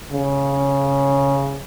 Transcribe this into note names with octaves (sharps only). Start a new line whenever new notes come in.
C#3